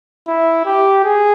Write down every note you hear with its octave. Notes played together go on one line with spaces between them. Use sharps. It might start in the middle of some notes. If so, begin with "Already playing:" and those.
E4
G4
G#4